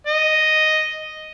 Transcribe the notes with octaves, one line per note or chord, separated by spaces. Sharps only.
D#5